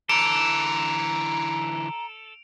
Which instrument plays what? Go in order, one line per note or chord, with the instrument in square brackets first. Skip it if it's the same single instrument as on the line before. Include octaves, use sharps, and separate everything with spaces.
[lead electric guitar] D3 E3 [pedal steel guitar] A4 [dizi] A#5 [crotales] D7 F7